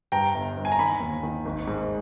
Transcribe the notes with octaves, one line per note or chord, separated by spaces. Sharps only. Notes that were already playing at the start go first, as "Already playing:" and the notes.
G2 G5 A#5
G1
G1
G#5
A#5
D#3 G#5 B5
D#2
D#3
G#1
G#2